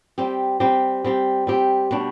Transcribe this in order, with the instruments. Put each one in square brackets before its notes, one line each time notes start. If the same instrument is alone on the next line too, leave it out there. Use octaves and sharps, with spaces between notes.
[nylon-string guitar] G3 C4 G4
G3 C4 G4
G3 C4 G4
G3 C4 G4
B2 G3 D4